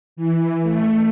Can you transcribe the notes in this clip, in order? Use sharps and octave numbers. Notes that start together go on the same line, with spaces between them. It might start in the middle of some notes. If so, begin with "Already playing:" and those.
E3
A3